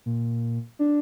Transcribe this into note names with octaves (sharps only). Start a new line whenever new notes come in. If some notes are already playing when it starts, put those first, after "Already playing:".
A#2
D4